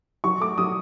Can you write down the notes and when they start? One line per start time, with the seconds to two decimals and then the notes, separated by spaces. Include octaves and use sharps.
0.24 F#3 C#6
0.40 A3 D6
0.58 F#3 D#6